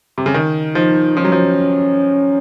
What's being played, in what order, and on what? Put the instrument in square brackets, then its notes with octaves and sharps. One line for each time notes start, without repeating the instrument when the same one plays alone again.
[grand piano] C3
C#3
D#3
[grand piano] F3 [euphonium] D#4
[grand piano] F3 [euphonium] C#4
[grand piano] F#3
F3